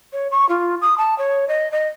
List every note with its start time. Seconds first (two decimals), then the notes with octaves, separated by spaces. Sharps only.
0.13 C#5
0.31 C#6
0.49 F4
0.81 D#6
0.98 A5
1.18 C#5
1.48 D#5
1.72 D#5